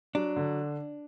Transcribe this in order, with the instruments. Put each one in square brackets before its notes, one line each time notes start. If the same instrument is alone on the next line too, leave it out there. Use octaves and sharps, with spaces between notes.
[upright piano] F#3 [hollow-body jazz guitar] D4
[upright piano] D3